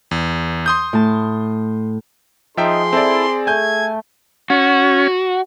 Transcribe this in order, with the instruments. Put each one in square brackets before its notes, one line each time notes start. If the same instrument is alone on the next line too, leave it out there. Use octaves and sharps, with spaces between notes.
[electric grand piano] E2
C6 D#6 G6
[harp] A2 A5
[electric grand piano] F3 E5 G5 [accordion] D#4 [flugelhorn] G#4 [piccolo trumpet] C6
[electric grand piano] C4 D5 [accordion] E4 A4
[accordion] A3 [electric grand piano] G#5 G6 [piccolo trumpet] G#6
[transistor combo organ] C#4 [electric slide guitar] F#4